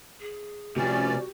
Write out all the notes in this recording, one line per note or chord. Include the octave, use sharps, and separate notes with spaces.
G#4
C3 F3 C#4 F#4 G4 D5